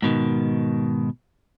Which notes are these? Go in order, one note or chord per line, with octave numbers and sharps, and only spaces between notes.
G#2 B2 D#3